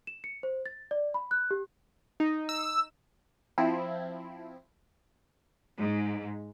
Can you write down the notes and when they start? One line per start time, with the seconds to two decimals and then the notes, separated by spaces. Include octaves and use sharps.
0.07 E7
0.24 C#7
0.43 C5
0.66 A6
0.91 D5
1.14 B5
1.31 F#6
1.51 G4
2.20 D#4
2.49 E6
3.58 F3 C4 E4
5.79 G#2